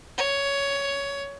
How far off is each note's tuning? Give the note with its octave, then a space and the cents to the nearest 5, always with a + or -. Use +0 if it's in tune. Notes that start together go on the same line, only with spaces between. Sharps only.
C#5 +15